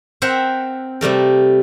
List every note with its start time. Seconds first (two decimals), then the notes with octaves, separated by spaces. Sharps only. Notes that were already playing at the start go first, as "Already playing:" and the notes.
0.22 C4 A#4 C5 E5 F#5
1.01 C3 G3 A3 A#4